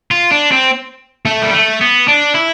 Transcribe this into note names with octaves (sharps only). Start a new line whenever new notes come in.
F4
D4
C4
A3
G3
A3
B3
D4
E4